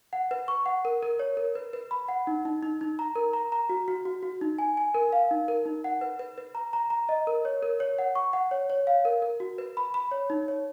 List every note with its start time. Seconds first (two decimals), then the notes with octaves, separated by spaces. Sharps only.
0.13 F#5
0.31 B4
0.48 C#6
0.66 F#5
0.85 A#4
1.03 A#4
1.19 C#5
1.37 A#4
1.55 B4
1.73 B4
1.91 B5
2.08 F#5
2.27 D#4
2.45 D#4
2.63 D#4
2.81 D#4
2.99 A#5
3.16 A#4
3.33 A#5
3.52 A#5
3.69 F#4
3.88 F#4
4.05 F#4
4.23 F#4
4.41 D#4
4.58 G#5
4.77 G#5
4.94 A#4
5.12 F5
5.31 D#4
5.48 A#4
5.66 D#4
5.84 F#5
6.01 B4
6.19 B4
6.38 B4
6.55 A#5
6.73 A#5
6.90 A#5
7.09 D#5
7.27 A#4
7.45 C#5
7.63 A#4
7.80 C#5
7.99 F#5
8.15 C#6
8.33 F#5
8.51 C#5
8.70 C#5
8.87 F5
9.05 A#4
9.22 A#4
9.40 F#4
9.58 B4
9.77 B5
9.94 B5
10.11 C#5
10.30 D#4
10.48 C#5